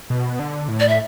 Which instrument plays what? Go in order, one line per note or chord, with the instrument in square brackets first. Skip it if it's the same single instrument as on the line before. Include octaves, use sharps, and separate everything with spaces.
[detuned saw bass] B2
D3
A2
[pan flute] D5
E5